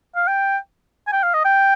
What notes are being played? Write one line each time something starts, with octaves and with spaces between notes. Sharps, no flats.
F5
G5
G#5
G5
F5
D#5
G5